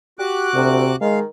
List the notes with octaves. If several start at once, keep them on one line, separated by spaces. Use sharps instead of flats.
F#4 G4 D6 F#6
D2 C3
D#3 G#3 F5